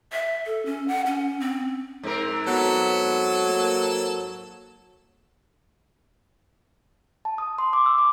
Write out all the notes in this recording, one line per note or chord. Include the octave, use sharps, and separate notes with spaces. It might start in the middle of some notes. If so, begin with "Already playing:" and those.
E5
A4
C#4
F#5
C#4
C4
G#2 C4 A#4
F#3 B3 A4
A#3
A5
D#6
C6
D6
E6
D6